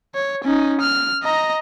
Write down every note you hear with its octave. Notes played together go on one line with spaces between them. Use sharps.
C#5
C#4 D#4
F6
D#5 A#5